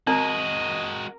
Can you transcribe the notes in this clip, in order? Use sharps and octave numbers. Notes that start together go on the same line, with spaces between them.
G#3 C4 F#4 A#4 D#5 A#5